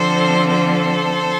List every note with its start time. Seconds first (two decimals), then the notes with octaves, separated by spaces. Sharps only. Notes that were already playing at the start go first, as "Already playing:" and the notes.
Already playing: D3 F3 C4 A4 C5
0.50 A4 C5